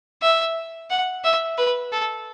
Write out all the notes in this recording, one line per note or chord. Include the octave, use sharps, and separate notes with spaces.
E5
F#5
E5
B4
A4